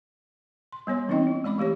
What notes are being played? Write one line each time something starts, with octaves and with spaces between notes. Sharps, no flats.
C6
G3 B3 C#5 C6
E3 C4 C#4 D#4 D#5 G5
E4
G#3 D5 B5 D6
E3 A3 G4 C#5